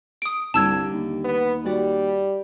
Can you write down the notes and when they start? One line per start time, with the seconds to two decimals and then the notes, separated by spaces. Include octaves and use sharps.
0.22 D#6 D7
0.54 C2 D3 G3 A#3 A5 E6 G#6
0.93 D#2
1.24 B3
1.65 G3 F#4 D5 F#5